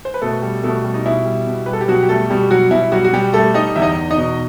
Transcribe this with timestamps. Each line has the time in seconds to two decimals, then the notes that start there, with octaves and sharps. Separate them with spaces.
0.05 C5
0.14 B4
0.21 B2 A3 A4
0.42 G3
0.63 B2 A3 A4
0.85 G3
0.94 D#4
1.05 B2 E4
1.25 G3
1.47 B2
1.66 G3 B4
1.73 A4
1.81 G4
1.88 B2 F#3 F#4
2.03 G4
2.09 G3 A3 A4
2.29 B2 G3 G4
2.51 F#3 G3 F#4
2.71 B2 E4
2.92 F#3 G3 F#4
3.05 F#4
3.13 B2 G3 G4
3.33 G3 A3 A4
3.54 G3 D#4 D#5
3.76 E2 E5
3.82 D#4 D#5
3.97 E2
4.11 D#4 D#5
4.17 B2